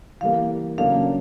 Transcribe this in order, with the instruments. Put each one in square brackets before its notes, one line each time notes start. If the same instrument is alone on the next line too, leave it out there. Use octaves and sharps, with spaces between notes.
[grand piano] E3 G3 A#3 [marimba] F5
[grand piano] C#3 F#3 A#3 D4 [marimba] F5